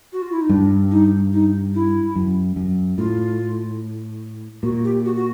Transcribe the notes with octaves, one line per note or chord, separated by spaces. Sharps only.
F#4
F4
E4
D#4
G2 D4
D#4
D#4
E4
F#2
F#2
A2 F4
A#2 F#4
G4
F#4
F#4